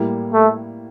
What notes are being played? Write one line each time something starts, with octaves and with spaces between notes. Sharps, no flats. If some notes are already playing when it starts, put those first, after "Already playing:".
Already playing: A2 G3 A#3 E4
A3